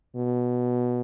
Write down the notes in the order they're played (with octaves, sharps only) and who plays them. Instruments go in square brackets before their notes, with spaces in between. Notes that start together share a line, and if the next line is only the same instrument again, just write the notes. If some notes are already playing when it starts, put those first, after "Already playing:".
[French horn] B2